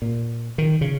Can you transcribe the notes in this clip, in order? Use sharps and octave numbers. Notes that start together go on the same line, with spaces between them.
A#2
D#3
C#3